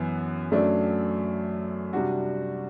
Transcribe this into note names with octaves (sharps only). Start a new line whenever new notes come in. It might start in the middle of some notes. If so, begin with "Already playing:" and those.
Already playing: F#2 E3 B3
F#2 F#3 A3 D4
C3 G3 D4 F#4